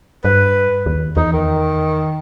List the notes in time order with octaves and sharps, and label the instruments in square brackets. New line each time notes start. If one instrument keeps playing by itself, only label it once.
[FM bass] G2 [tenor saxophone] B4
[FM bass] D#2
[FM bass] E2 [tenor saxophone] D#4
[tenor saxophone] D#3